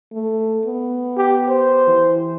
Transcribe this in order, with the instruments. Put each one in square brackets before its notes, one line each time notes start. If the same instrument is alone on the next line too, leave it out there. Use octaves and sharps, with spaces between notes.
[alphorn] A3
B3
[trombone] G4
C5
[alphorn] E3